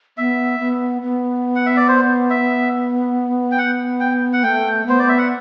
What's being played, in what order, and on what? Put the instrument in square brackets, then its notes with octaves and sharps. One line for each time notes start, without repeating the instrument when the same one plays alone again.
[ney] B3 [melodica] E5
[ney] B3
B3
[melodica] F#5
E5
D5
C5
E5
G5
F#5
G5
F#5
[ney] A3 [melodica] G5
[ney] B3 [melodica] C5
[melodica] D5
E5
F#5